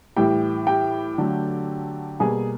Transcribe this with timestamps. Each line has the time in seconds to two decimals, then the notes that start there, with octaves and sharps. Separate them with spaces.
0.16 A2 E3 G3 G4 G5
0.67 G4 G5
1.18 D3 F#3 A3
2.20 B2 G3 A#3 G#4 G#5